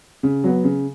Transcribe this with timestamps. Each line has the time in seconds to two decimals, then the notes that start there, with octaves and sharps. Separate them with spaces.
0.23 C#3
0.44 F#3 B3
0.64 C#3